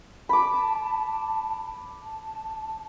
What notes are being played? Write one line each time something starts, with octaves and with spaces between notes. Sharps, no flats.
A5 B5 D6
A5